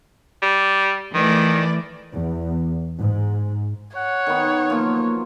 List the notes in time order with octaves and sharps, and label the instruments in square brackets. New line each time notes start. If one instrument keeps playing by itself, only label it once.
[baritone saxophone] G3
[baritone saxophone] D#3 [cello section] E3 A3 D5
[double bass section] E2
G#2
[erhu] C#5 [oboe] F#5
[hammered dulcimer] D#3 B3
[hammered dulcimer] F3 F#3 [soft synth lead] A#3